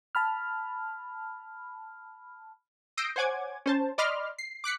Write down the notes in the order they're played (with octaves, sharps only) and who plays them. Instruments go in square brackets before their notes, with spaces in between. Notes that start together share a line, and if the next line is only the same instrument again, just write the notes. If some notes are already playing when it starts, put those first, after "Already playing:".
[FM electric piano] A5 B5 F6
[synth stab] D#6 E6 G6 A#6 C7 D7
C5 C#5 F#5 G#5 D6 G#6
C#4 C5 A5
D5 D#5 B5 C6 D6 F6
C7
D6 F#6 B6 C#7